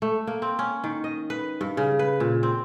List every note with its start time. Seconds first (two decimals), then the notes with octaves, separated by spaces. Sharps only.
0.02 A3
0.27 A#3
0.42 C4
0.59 C#4
0.84 D#3
1.04 D#5
1.30 B4
1.61 G2
1.77 C#3
1.99 B4
2.20 A#2
2.43 C4